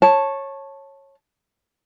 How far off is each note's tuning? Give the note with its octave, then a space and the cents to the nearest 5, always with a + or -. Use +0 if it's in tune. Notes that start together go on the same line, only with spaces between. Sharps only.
C#5 -15 A5 +0